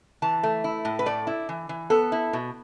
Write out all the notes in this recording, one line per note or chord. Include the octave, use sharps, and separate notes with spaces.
E3 A5
A3
E4
A2
B4
A3 D5
E4
E3
E3
B3 A4
E4
B2